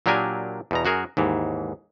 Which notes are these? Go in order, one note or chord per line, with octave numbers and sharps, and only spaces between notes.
A#2 F#3 D4 G4 A#4 G#5
E2 B2 A#5
F#2 F#4 G#4 A#4
D#2 G#2 E3